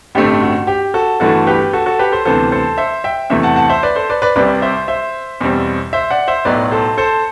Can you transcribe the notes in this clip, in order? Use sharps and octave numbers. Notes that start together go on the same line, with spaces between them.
A1 G2 D3 A3 C4 G4
F#4
G4
F#4 A4
G1 G2 E3 A3 F#4 A4
G4 B4
F#4 A4
F#4 A4
G4 B4
A4 C5
D2 C3 E3 B3 A4 C5
A4 C5
C5 E5
E5 G5
E2 C3 E3 A3 E5 G5
F#5 A5
F#5 A5
C5 E5
B4 D5
A4 C5
B4 D5
B4 D5
C2 C3 G3 C4 B4 D5
C5 E5
C5 E5
E2 B2 G3 C4
C5 E5
D5 F#5
C5 E5
B1 A2 F#3 B3 B4 D5
A4 C5
A4 C5